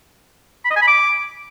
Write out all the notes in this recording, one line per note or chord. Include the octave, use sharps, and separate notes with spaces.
B5
D#5
G#5
B5
D6